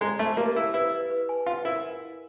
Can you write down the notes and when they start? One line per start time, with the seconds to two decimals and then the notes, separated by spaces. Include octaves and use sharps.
0.01 G#3 A#5
0.19 A3 C5
0.37 A#3 G4
0.56 E4 F5
0.74 E4 B4
0.92 D#5
1.10 B4
1.29 G#5
1.46 F4 F#5
1.65 E4 A#4